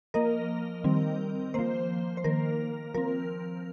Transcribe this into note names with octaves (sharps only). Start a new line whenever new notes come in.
F3 A#3 A#4 D#5
D#3 G3 C4
F3 A#3 C5
C5
D#3 A#3 A#4
F3 C4 A#4